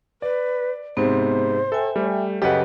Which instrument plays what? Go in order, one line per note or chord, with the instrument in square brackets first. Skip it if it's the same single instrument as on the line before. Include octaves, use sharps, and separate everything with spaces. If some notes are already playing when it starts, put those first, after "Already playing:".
[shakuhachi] B4 [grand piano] D5
[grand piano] G#2 C3 [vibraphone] B3 [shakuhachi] C5
[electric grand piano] A4 [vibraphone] E5 G5 G#5
[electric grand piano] G3 [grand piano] A3
[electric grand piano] F#2 C#3 B4 [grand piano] G4 F#5 [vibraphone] A4 D#5